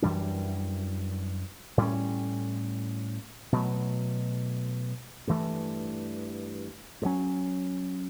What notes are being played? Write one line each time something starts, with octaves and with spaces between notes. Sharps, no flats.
F#2 E3 G3 D4
A2 G3 C#4
B2 F#3 A3
G2 E3 A3
G2
F#3 C#4